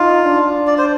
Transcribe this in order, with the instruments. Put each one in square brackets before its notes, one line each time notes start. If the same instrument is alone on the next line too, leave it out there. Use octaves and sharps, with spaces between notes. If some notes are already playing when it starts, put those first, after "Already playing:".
Already playing: [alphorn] D#4 [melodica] F4
[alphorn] D4
[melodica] D5
C5